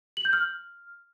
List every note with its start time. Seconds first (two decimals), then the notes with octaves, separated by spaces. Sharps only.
0.17 F#7
0.25 G6
0.33 F6